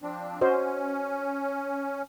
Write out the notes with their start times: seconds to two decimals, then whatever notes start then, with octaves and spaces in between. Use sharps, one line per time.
0.02 F3 C4 D4
0.41 C#4 F#4 C5 D#5